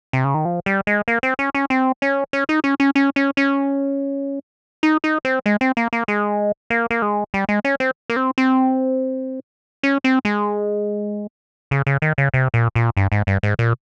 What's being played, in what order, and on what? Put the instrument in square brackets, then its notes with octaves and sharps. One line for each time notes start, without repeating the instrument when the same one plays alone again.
[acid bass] C3
C#3
D#3
F3
G3
G#3
A#3
C4
C#4
C#4
C4
C#4
C#4
D#4
C#4
C#4
C#4
C#4
C#4
D#4
D#4
C4
G#3
C4
A#3
A#3
G#3
A#3
A#3
G#3
G3
G#3
C#4
C4
A#3
C4
C4
C#4
C4
G#3
C#3
C#3
D#3
C#3
C3
A#2
A#2
G2
G#2
G2
G#2
A#2